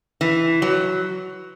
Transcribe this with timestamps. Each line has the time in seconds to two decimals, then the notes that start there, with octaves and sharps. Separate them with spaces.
0.21 E3
0.62 F#3